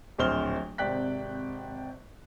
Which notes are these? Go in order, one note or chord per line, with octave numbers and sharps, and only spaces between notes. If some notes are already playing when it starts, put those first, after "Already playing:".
D1 A#1 C5 F6 G7
G#1 C3 D5 G5 F#6 B6